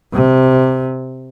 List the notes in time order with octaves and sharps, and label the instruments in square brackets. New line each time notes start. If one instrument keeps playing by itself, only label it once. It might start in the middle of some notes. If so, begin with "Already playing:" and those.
[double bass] C3